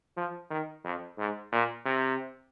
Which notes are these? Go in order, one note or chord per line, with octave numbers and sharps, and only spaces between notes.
F3
D#3
F2
G#2
A#2
C3